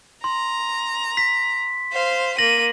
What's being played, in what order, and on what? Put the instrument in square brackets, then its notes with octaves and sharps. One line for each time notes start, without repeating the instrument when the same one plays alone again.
[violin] A#5 [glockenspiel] C6
[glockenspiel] B6
[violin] C5 F5
[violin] A#3 D#7 [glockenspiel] A#6 F#7